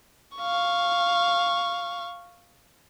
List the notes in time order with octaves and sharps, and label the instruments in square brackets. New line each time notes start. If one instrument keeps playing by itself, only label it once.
[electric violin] F5 C#6